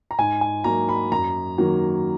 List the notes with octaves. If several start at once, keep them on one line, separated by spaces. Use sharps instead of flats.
A#5
G#2 G#5
G#5
F#3 A#3 A#5
B5
F#2 A#5
D#3 F#3 A#3